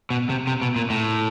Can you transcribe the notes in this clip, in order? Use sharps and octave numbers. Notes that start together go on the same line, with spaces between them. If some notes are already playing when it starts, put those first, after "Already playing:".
B2
C3
C3
B2
A#2
A2